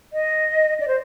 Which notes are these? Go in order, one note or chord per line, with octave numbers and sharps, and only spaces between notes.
D#5
D5
C5